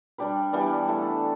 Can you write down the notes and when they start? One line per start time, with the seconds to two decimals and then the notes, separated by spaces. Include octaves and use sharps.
0.18 G3 D4 G4 B4
0.53 E3 G3 B3 D4
0.88 A3 E4 A4